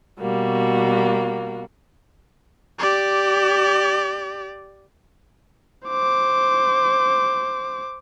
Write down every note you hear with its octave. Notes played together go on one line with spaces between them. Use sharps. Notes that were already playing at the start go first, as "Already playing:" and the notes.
B2 G3 A#3 F#4
G4 D5
C5 D6